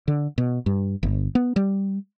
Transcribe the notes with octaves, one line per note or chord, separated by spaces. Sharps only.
D3
B2
G2
G1
B3
G3